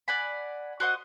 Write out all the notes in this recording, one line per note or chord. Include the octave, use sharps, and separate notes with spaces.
D5 F#5 G#5 B5
F#4 C5 D#5 F#5